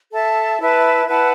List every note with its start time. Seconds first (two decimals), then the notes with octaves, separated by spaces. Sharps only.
0.12 A4 E5 A5
0.59 E4 B4 E5 A5
1.07 E4 B4 F#5 A5